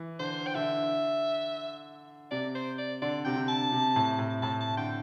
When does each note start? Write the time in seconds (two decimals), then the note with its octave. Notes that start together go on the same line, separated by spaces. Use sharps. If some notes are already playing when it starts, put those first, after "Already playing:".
Already playing: E3
0.19 D3 C5
0.47 G5
0.55 D3 E5
2.31 C3 D5
2.55 C5
2.78 D5
3.02 D3 D5
3.25 C3 G5
3.36 D3
3.48 A5
3.72 C3
3.96 A2
4.19 A2
4.42 A2 A5
4.61 A5
4.77 D3 G5